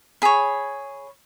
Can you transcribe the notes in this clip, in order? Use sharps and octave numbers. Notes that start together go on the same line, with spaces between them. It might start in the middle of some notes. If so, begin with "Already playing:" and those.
G#4 C#5 B5